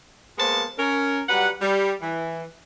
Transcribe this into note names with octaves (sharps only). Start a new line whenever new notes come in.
G#3 A#3 B3 C5 A5
C#4 A#4
F#3 G3 B4 F#5
G3
E3